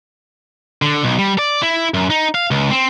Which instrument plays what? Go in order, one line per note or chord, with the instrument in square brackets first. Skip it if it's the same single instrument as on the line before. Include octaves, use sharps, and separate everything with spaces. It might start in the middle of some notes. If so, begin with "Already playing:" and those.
[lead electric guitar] D3
B1
G3
D5
E4
F#2
D#4
F5
C#2
C4